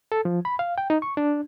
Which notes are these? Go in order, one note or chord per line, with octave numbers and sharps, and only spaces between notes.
A4
F3
B5
F5
G5
D#4
C#6
D4